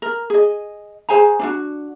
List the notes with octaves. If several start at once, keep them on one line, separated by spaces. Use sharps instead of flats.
A#4
G#4 D#5
G#4 C5 G#5 A#5
D4 F4 F#4